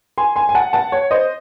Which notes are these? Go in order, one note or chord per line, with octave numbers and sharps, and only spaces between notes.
G#5 C6
G#5 C6
G#5
F#5 A5
F#5 A5
C#5
C5 D#5